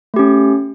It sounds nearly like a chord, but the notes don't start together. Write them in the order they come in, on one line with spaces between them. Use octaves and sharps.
A3 G4 C#4